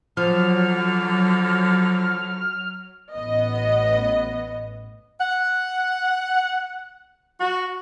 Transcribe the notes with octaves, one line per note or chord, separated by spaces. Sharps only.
D3 F3 F#3 F6
A1 B3 D#5
F#5
F#4